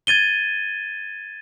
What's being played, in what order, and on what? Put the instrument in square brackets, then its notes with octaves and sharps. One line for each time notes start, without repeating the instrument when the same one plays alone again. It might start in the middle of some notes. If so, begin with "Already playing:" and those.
[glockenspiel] G#6 A6 D#7 G7